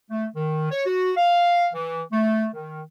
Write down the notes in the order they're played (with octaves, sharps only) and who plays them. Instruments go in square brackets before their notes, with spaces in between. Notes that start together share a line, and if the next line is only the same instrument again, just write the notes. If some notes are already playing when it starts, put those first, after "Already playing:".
[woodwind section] A3
D#3
C#5
F#4
F5
E3
A3
D#3